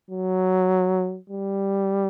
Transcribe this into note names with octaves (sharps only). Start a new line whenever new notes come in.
F#3
G3